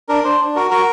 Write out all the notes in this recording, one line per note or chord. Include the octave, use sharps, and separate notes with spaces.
D4 A#4
D4 C5
D4
F#4 A#4
F#4 A#4